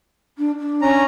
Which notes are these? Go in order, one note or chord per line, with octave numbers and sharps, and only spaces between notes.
D4
D4
C#4 A#5